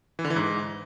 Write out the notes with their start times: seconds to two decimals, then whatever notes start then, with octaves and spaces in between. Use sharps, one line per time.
0.19 E3
0.25 D3
0.30 E3
0.36 G#2